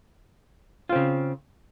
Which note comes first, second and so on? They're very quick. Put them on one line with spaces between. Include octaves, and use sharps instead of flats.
F4 C4 C#3